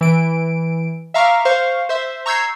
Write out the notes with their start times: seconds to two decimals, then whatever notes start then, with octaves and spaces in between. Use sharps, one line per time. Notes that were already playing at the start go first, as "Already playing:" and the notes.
0.01 E3 D7
1.14 E5 F5 A#5 C#6 D6 F6
1.45 C5 F5 C#6
1.89 C5 E5
2.26 A#5 C#6 E6 G6 G#6 C7